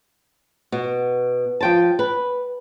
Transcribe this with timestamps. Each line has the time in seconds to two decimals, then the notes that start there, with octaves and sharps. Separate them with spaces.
0.72 B2
1.61 F3 G5 A5
1.99 B4